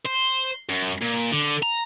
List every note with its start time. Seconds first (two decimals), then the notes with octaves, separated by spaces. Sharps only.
0.05 C5
0.69 F#2
1.01 A#2
1.32 D3
1.63 A#5